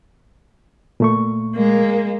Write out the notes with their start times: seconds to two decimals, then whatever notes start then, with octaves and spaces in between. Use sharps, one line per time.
1.00 A#2 A3 C#6
1.53 G#3 A#3